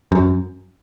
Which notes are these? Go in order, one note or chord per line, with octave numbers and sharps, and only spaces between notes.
F#2